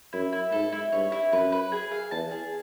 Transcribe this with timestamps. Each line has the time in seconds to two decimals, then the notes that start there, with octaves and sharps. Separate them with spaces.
0.13 F#2 E4
0.33 E4
0.52 G#2 A4
0.72 E4
0.92 G2 C#5
1.12 E4
1.32 F#2 B4
1.52 B4
1.72 G#4
1.92 F5
2.11 E2 A5
2.31 G#4